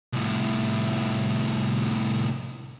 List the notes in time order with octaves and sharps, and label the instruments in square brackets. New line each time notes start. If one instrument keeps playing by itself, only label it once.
[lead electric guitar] C2 A2